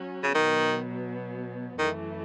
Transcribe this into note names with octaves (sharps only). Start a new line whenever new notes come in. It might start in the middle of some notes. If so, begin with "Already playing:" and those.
Already playing: F#3 C#4 F#4
C#3
B2 D#3 F#3 B3
F#2 D#3 E3 A3